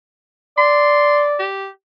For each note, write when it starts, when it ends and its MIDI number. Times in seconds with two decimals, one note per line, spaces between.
0.58 1.44 74
0.58 1.23 84
1.39 1.68 67